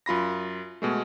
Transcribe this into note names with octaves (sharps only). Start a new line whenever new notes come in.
F#2 F4 B5 A#6
B2 G#3 A3